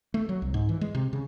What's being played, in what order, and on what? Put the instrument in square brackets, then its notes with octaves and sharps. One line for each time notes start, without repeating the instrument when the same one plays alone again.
[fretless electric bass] A3
F#3
C2
G#2
E3
G#3
C3
C#3